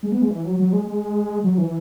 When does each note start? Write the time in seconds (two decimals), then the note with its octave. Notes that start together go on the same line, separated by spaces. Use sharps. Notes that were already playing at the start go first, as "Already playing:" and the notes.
0.03 G#3
0.12 B3
0.22 G#3
0.31 E3
0.45 F#3
0.59 F#3
0.73 G#3
0.88 G#3
1.44 F#3
1.58 E3